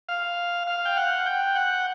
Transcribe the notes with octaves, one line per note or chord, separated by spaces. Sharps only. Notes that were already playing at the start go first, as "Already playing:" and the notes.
F5
F5
G5
F#5
G5
F#5